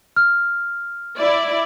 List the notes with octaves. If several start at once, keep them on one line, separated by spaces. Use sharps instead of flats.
F6
E4 D5